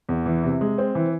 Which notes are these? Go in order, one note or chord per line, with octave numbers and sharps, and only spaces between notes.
E2
E3
C3
G#3
C4
E3